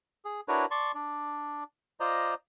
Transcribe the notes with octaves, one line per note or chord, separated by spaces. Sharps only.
G#4
D4 E4 F#4 A#4 B4 C#5
D5 A5 C6 C#6
D4 D5
F4 C5 D5 D#5 A#5